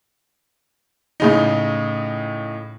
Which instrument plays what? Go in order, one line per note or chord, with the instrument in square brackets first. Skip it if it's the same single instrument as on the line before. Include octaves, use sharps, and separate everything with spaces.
[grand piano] A2 C#3 D#4